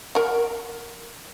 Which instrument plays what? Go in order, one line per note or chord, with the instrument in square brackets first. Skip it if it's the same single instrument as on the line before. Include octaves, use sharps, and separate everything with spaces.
[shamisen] A#4 F#5